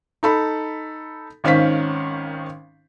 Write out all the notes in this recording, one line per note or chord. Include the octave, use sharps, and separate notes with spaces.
D#4 A4 B5
G#1 D#3 C#4 C5 F5 B6